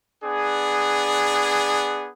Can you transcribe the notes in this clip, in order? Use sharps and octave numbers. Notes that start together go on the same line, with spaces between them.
B3 D4 G#4